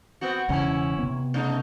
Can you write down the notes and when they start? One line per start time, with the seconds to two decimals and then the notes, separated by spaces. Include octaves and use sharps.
0.21 B3 C4 F#4
0.49 E1 E2 C#3 C#4 E4
0.99 C3 B3
1.34 C#3 A3 D#4